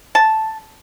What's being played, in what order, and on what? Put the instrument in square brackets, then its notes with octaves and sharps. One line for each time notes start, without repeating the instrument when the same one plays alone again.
[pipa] A5